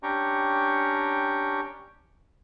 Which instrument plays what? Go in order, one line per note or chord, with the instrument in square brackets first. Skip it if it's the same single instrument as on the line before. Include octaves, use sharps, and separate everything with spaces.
[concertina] C#4 D4 G4 G5 A#5 C#6